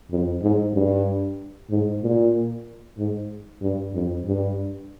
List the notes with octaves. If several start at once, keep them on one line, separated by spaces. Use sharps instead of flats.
F2
G#2
G2
G#2
A#2
G#2
G2
F2
G2